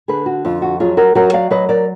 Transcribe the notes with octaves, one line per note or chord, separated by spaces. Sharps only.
D3 G#4 B4
F#4
F2 F4
F#4
F#3 F4 G#4
F#4 A#4
F#3 F#4 A#4
D5 F5
F#3 B4 D#5
A#4 D5